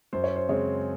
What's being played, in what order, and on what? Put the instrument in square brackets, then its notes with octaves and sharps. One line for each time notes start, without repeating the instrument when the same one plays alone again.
[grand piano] F#2 [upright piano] C5
[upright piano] C#5
C5
[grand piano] C#3 G#3 C4 [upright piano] C#5